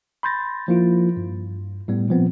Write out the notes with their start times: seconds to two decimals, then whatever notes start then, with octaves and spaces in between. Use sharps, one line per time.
0.23 B5 C6 G6 A6 A#6
0.68 F3 A#3 E4 F4
1.17 G2
1.88 A2 G3 B3
2.09 A#2 F3 B3 C4